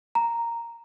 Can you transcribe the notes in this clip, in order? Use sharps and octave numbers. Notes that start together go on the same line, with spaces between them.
A#5